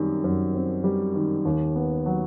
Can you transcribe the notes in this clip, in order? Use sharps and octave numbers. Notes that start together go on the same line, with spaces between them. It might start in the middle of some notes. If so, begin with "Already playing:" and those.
Already playing: F#2 D#3 G3 C4
F#2
C4
G3
D#3
D#2
B3
F#3